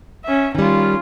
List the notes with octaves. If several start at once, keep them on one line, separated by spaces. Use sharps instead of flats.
C#4 E5
D#3 G3 C#4 F4